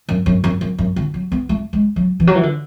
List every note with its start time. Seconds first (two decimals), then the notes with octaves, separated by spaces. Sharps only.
0.09 F#2
0.26 F#2
0.44 F#2
0.61 F#2
0.78 F#2
0.96 D3
1.14 F#3
1.32 B3
1.49 A3
1.73 G#3
1.96 F#3
2.20 E3
2.27 F#3
2.35 E3
2.43 D3